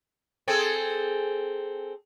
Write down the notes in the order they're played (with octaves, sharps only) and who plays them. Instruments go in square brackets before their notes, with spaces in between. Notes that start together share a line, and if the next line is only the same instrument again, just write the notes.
[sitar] C4 G#4 A4